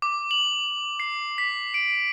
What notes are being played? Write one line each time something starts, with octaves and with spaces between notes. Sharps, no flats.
D6
F#7
C7
B6
D7